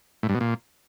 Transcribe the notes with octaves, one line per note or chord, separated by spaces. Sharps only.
A2
G2
B2
A#2